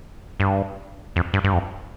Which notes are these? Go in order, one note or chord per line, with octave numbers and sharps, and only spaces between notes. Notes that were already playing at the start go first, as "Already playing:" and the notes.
G2
F2
G2
G2
F2